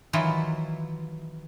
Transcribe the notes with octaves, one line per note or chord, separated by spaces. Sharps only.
D#3 E3 F#3 E4 F4